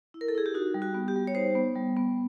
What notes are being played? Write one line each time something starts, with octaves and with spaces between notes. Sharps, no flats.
E4
A#4
A4
E4 G#4
G4
D#4 F#4
G3
F#4
B3
G4
G3
C#5
D#4 C5
B3
G3
B3